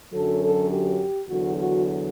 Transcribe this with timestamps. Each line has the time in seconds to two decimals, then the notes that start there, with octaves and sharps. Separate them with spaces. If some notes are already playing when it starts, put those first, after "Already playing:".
0.13 F#2 D3 F#3 A4
0.43 A4
0.71 G4
1.28 E2 D3 F#3 F#4
1.57 F#4